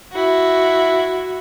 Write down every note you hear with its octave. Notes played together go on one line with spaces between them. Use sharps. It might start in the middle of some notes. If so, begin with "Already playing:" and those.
E4 F#4